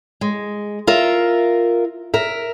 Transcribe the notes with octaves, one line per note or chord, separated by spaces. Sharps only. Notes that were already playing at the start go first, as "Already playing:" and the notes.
G#3
F4 A#4 E5
A#4 E5